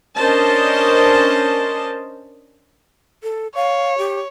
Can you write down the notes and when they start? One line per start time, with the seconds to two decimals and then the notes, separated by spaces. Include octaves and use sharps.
0.16 C#4 D4 A#4 C5 D#5 A5
3.23 A4
3.55 C#5 F5
3.98 G4